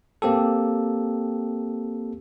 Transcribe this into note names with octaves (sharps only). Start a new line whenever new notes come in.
A#3 C4 G4 A4